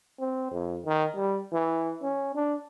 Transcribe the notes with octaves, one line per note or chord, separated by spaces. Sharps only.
C4
F2
D#3
G3
E3
C#4
D4